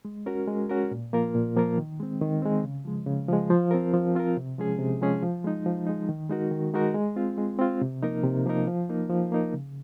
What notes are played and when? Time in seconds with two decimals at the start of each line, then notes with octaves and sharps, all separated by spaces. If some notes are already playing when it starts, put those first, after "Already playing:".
0.05 G#3
0.26 C#4 F#4 A#4
0.48 G#3
0.69 C#4 F#4 A#4
0.91 A#2
1.13 F3 A#3 F4 A#4
1.35 A#2
1.56 F3 A#3 F4 A#4
1.78 D#3
1.99 G#3 C4
2.21 D#3
2.42 G#3 C4
2.64 C#3
2.85 F3 G#3
3.07 C#3
3.28 F3 G#3
3.50 F3
3.71 C4 F4 A#4
3.94 F3
4.15 C4 F4 A#4
4.37 C3
4.58 F3 G#3 C#4 G#4
4.79 C3
5.01 F3 G#3 C#4 G#4
5.22 F3
5.44 G#3 D#4
5.66 F3
5.87 G#3 D#4
6.09 D#3
6.30 G#3 D#4 F#4 A#4
6.51 D#3
6.74 G#3 D#4 F#4 A#4
6.95 G#3
7.16 C4 F4
7.38 G#3
7.59 C4 F4
7.81 C3
8.02 F3 A#3 D#4 A#4
8.24 C3
8.46 F3 A#3 D#4 A#4
8.67 F3
8.89 A#3 D#4 A#4
9.10 F3
9.32 A#3 D#4 A#4
9.53 C#3